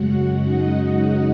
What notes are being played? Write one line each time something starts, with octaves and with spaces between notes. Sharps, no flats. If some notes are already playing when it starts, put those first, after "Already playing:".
Already playing: F#2 C#3 G#3 F#4 F#5
D#4 D#5